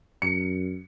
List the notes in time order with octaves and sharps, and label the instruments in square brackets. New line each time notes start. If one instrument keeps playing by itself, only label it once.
[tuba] F#2 [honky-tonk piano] C#7